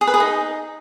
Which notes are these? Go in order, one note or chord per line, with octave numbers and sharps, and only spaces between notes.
G#4
B4
G#4
D#4